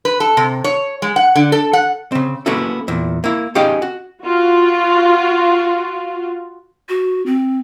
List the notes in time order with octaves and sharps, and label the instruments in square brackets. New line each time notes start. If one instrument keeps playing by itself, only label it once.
[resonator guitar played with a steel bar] B4
A4
C3
C#5
G#3
F#5
D3
A4
F#5
[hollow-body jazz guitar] C#3 C4
A#3 B3 C#4 E4 F#4 A4
E2 A#2
A#3 E4
C#4 D#4 G4 G#4 F5 G5
F#4
[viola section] F4 F#4
[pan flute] F#4
C4